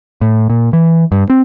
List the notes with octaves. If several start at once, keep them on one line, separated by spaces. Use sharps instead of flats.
A2
A#2
E3
G2
C4